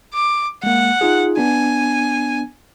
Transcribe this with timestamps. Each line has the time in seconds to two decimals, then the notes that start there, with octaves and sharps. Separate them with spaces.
0.14 D6
0.63 G#3 A#3 F#5
1.01 D#4 F4 G#4
1.37 B3 D4 G#5